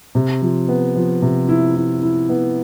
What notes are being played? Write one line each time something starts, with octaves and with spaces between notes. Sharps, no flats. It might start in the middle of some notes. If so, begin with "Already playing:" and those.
C3
F3
B3
F3
C3
E4
E4
E4
B3